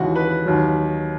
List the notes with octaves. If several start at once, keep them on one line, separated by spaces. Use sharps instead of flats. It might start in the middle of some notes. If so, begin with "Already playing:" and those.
Already playing: D#2 C#3 E3 G#3 F#4
B4
D#2 D#3 F#3